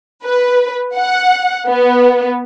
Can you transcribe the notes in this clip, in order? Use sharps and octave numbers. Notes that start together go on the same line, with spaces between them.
B4
F#5
B3